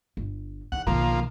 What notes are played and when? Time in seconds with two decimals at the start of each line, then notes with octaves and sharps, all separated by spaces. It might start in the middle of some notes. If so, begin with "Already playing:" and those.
0.17 G1
0.72 E2 D#3 F#5
0.87 B1 D#3 F3 A#3